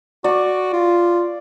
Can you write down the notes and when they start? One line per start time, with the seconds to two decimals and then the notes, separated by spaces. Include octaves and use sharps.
0.24 F#4 D5 C#6
0.73 F4